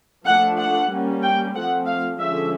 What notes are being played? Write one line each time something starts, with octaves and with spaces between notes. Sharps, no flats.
F3 A3 D4 F#5
F#5
G3 A#3 C#4
G5
F3 A3 C4 F#5
F5
D3 F3 G#3 C#4 E5